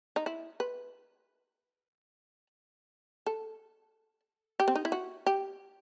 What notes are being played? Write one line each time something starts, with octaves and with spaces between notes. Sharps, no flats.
D#4
E4
B4
A4
G4
C4
D#4
E4
F#4
G4